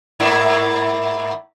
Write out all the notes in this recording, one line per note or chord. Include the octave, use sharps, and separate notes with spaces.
G#2 A#3 E4